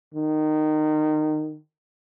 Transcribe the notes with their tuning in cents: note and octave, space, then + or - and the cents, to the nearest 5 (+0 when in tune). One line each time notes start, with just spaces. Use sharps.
D#3 -20